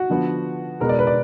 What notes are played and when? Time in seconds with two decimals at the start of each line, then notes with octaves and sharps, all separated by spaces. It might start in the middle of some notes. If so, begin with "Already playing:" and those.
Already playing: F#4
0.10 D3 F3 B3
0.80 B2 G#3 B3 A#4
0.89 D5
0.99 B4
1.07 D5